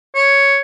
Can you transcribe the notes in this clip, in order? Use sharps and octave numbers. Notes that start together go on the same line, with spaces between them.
C#5